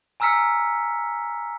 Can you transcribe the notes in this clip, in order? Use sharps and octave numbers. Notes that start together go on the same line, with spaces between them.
G#5 A#5 E6 F6 B6 C#7